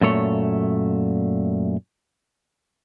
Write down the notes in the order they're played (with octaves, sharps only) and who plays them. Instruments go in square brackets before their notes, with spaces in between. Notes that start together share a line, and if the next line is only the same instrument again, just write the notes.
[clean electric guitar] F#2 A#2 A3 C#5